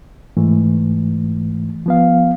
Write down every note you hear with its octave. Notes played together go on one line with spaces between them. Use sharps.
G#2 E3 A3
F3 B3 F5